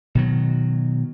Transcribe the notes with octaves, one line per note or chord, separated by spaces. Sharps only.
B2 D#3 F#3